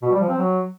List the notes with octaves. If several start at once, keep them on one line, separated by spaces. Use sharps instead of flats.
B2
G3
F3
C4
F#3